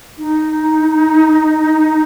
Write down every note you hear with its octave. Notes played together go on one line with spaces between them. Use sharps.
D#4